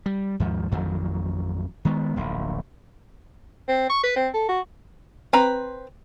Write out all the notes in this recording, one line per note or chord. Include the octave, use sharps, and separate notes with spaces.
G3
D#2 G#2 F3
A1 F2 D#3 F#3
D#3 G#3 B3
D1 A#1
C4
C#6
B4
C4
A4
F#4
C4 B4 A#5